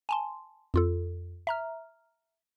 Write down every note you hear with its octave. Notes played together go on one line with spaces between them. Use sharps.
G#5 A5 C6
F2 F4 A4
E5 A#5 F6